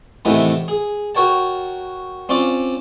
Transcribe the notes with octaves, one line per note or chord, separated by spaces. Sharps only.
A2 C3 D#3 E3 B3
G#4
F#4 A#4 C#5 G5 A5
C4 C#4 F4 D5